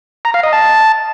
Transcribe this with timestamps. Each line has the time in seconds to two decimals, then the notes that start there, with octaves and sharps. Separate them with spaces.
0.25 A#5
0.34 F5
0.43 D#5
0.53 A5